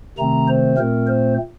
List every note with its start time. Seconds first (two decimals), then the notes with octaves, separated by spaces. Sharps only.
0.18 C3 D#3 A3 C4 A#5
0.48 C5
0.78 A#2 A3 C4 A#4
1.07 C5